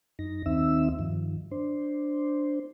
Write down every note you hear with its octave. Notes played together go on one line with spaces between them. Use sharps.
F#2 D#4 A#6
D#2 D#3 C4 D#4 E5 E6
G2 D#3 F3
D4 C5